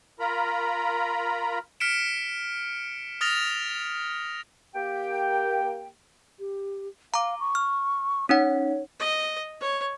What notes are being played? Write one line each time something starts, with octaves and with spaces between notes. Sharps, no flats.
F4 A#4 A#5 B5
F6 B6 C#7 D7 E7
D#6 F6 A6 A#6 F7
A#3 G4 G5
G4
F5 A#5 D6
C#6
F6
C#4 D#4 C#5 F#5
D#5
C#5